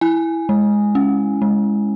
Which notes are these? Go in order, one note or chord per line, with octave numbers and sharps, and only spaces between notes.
E4 G#5
G#3
C#4
G#3